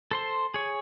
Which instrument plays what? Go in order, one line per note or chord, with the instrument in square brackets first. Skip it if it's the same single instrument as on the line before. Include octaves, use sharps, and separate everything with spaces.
[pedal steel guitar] A4 C5 C6
G#4 C#5